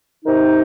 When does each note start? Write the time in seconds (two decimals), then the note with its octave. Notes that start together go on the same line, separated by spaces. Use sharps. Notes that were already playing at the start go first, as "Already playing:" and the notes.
0.24 C3 D#3 D#4